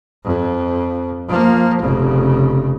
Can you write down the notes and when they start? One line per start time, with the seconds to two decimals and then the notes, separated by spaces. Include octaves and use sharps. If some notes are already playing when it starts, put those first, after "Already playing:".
0.24 F2
1.28 F3 A#3
1.82 F1 C#3